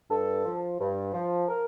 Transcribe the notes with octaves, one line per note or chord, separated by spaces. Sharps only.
G2 A4
F3
G2
F3
A#4